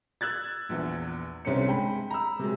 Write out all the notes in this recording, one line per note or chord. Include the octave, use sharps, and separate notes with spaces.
E6 F#6 G#6 A6
A#1 E2
G1 C2 C4 C#4 C#7
G#3 G5 B5
A#5 B5 E6
C3 F#3 G#3